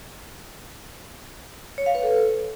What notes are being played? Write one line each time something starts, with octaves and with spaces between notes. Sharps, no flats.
C#5
F5
B4
A4